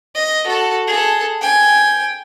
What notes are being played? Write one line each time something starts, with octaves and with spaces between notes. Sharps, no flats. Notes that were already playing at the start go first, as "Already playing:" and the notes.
D#5
F#4 A4
G#4 A4
G5 G#5